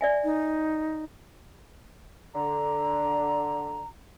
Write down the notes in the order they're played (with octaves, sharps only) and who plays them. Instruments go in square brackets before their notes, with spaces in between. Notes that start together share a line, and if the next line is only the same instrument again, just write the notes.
[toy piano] D5 E5 G#5
[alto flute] D#4
[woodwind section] D3 [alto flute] A#5